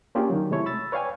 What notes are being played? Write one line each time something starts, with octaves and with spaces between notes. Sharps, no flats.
A#3 C#4 D4 F4 G4 G#4
D#3 F#3
C3 G#3 A3 E4 C#5
B5 E6 A6
B4 C#5 D5 F5 G5 G#5